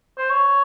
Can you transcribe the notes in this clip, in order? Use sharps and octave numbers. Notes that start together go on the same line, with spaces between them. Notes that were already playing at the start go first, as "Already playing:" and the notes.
C5
C#5